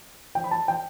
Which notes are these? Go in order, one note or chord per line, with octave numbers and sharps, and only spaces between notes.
G5
B5
A5
G5